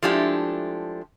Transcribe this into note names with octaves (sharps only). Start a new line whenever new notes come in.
F3 G#3 A3 D4 E4 G4